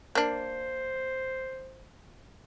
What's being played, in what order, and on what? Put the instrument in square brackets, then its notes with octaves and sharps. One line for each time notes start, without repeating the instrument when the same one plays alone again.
[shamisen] A#3 D4 [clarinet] C5